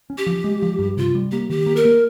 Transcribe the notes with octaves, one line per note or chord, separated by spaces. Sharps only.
C#4
G4
F3
G#3
F3
G2
C3 F4
G3
A#3 G4
D#3 G4
A#3
A#4
A#3